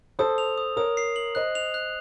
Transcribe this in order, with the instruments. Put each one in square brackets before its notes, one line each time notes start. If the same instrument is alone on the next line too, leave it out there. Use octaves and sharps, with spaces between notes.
[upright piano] A4 C5 [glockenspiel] D#6
[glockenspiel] F7
D#6
[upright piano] A#4 C#5 [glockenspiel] D#6
[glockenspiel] C7
F#7
[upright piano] C5 D#5 [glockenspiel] F#6
[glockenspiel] F7
F#6